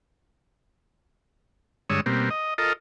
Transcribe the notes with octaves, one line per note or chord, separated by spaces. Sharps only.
G2 D3 G#3 C#5 D#6 E6
B2 G3 A#3 C4
D#5
F4 A4 A#4 D#5